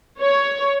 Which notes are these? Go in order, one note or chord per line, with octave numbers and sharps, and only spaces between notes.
C#5